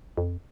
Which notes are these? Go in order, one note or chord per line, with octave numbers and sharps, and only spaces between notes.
F2